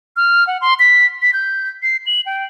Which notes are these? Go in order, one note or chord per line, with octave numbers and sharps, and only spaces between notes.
F6
F#5
C6
B6
B6
G6
C7
F#7
G5